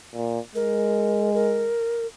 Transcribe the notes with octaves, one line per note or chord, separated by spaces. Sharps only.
A#2
G#3 A#4
A#4